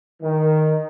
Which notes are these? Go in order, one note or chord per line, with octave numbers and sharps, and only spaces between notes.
D#3